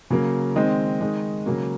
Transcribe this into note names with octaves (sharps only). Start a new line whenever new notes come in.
C#3 F#3 A#3
D#3 G#3 C4 D#5
D#3 G#3 D#4
C#3 F#3 A#3